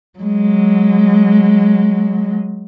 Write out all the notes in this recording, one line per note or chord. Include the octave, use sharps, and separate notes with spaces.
F#3 G#3